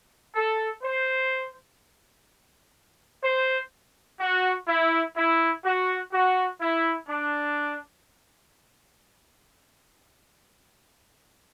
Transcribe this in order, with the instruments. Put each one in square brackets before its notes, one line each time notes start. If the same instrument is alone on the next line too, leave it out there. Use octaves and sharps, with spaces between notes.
[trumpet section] A4
C5
C5
F#4
E4
E4
F#4
F#4
E4
D4